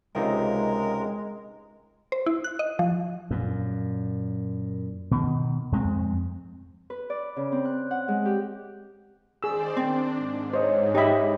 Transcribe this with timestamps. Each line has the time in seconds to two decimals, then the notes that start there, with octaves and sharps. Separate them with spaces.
0.15 C#2 C3 G#3 D#4 A#4
2.12 C5
2.26 E4
2.44 F#6
2.59 D#5
2.79 F3
3.31 F#2 A#2
5.11 B2 D#3
5.72 F2 G#3 A#3 C4
6.90 B4
7.10 D5
7.37 C#3
7.52 C4
7.65 F#6
7.91 F#5
8.08 G#3
8.25 G4
9.43 D#3 G#4 C5 D5 E6
9.77 C4 D4
10.15 G#2
10.53 C5 C#5 D#5
10.95 D#4 G4 D#5 E5 B5